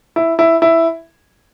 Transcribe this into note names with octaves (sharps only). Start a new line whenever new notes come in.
E4
E4
E4